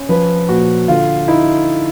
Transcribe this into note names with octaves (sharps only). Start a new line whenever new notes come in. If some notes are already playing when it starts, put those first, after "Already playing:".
Already playing: C#4
F3 B4
A#2 F#4
D3 F4
D#4 E4